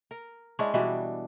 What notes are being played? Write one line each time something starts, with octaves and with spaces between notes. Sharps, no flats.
A#4
G#3 C#4 D4 E4
B2 E3 G3 D4